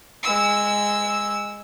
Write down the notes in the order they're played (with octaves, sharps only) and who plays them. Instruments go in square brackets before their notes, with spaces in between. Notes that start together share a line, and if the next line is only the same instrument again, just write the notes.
[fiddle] G#3 E6